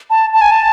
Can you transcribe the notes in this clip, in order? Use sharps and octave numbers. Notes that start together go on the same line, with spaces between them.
A5
A5
G#5
A5